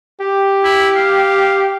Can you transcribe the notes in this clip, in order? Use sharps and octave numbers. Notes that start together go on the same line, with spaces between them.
G4
E4
F5